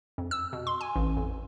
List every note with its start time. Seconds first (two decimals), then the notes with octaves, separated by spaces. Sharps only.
0.18 F2
0.31 E6
0.53 B2
0.67 C6
0.81 G#5
0.96 A1
1.17 F2